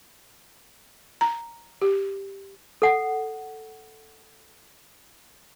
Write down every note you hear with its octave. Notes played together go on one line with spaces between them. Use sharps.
A#5
G4
A4 F#5